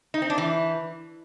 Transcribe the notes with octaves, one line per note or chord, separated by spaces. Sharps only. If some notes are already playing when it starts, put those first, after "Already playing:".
D#4
C4
D4
E3